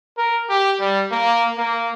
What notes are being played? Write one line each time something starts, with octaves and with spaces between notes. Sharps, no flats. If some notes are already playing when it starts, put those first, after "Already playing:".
A#4
G4
G3
A#3
A#3